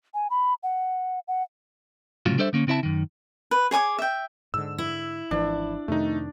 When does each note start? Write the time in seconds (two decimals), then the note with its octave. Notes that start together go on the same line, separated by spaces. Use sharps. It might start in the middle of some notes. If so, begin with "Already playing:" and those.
0.14 G#5
0.30 B5
0.63 F#5
1.28 F#5
2.26 C2 A2 C#3 F#3 F4
2.38 G3 D4 A4 C5 D5 E5
2.53 D3 A#3 C#4
2.67 C#3 C4 E4 E5 A5
2.83 F#2 D#3
3.51 B4
3.71 G#4 C#5 G#5 D6
3.99 E5 G5
4.54 G#2 D3 E6
4.78 E4
5.31 G#1 E3 F3 D4
5.88 F2 C3 D#3 A3 D#4